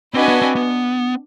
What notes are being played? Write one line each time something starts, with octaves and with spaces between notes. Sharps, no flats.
C4 D4 F#4 B4 D#5 G#5
B3
C4
B3